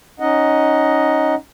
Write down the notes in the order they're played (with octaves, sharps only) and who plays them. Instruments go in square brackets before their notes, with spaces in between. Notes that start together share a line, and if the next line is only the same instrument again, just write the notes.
[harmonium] C#4 D#4 D#5 F#5